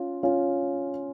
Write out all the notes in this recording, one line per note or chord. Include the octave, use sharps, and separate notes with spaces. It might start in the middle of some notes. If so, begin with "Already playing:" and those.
Already playing: C#4 F4
C#4 F4